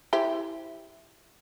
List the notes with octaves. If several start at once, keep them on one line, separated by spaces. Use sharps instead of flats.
E4 G4 C5